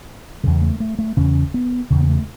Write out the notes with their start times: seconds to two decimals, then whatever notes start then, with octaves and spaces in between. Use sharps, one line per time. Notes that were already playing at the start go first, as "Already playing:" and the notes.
0.43 E2 C#3 F#3
0.62 A3
0.80 A3
0.99 A3
1.17 E2 C#3 C#4
1.54 B3
1.90 E2 C#3
2.01 B3
2.09 A3